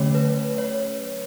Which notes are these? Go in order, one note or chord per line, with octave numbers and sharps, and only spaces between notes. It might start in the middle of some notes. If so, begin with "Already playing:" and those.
Already playing: D3 F#3 A3 C#4 C#5
B4
C#5